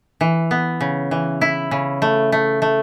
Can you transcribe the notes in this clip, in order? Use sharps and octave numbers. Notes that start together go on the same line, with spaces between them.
E3
B3
C#3
E3
E4
C#3
A3
A3
A3